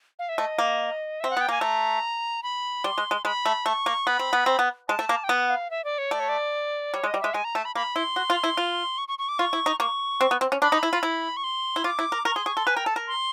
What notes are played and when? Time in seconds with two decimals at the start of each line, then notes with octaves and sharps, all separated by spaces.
0.19 F5
0.29 E5
0.38 A3 D#5
0.58 A#3
1.20 C4 E5
1.30 F#5
1.37 B3 G5
1.49 A#3 G#5
1.61 A3 A#5
2.43 B5
2.84 G3 C6
2.98 G#3
3.11 G#3
3.25 G#3 B5
3.46 A3
3.66 A3 C#6
3.86 A#3
4.07 B3 B5
4.19 C4
4.33 B3
4.46 C4
4.59 B3
4.88 G#3 A5
4.99 A3
5.09 A#3
5.24 G5
5.29 B3 F#5
5.50 F5
5.71 E5
5.84 D5
5.98 C#5
6.11 A3 D5
6.20 C#5
6.29 D5
6.94 G3 C#5
7.04 G#3
7.07 D#5
7.14 G3
7.21 G#3 E5
7.34 G#3 G#5
7.44 A#5
7.55 A3 A5
7.65 B5
7.75 A#3 B5
7.96 E4 C6
8.16 F#4
8.30 F4
8.44 E4
8.57 F4
8.98 C#6
9.08 C#6
9.19 C#6
9.29 D6
9.39 F4 C#6
9.53 E4
9.66 D#4
9.80 A#3 C#6
10.21 C4
10.31 B3
10.41 C4
10.52 C#4
10.62 D4 B5
10.72 D#4
10.83 E4
10.93 F4
11.03 E4
11.37 C#6
11.44 C6
11.76 E4
11.84 F4 D6
11.99 E4
12.12 A#4
12.25 A#4 C#6
12.36 G#4 C6
12.46 G#4 C#6
12.57 A4 C6
12.67 B4 G#5
12.76 A#4 G5
12.86 A4 A5
12.96 A#4
13.07 C6